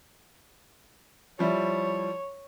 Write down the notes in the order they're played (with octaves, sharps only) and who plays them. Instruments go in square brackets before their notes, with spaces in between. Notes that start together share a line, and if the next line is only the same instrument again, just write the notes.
[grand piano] F3 G3 E4 [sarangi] C#5